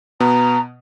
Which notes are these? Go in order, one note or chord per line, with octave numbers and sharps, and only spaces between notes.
B2 B3 A#5